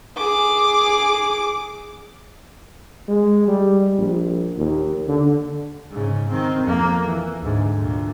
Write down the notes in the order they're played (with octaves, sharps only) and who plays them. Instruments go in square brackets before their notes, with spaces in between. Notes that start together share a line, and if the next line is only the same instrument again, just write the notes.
[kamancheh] G#4 D6
[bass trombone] G#3
G3
A#1
D#2
D3
[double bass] G#2 C#3
D#3 C4
F2 A#3
E3
D2 G#2
D2 A#2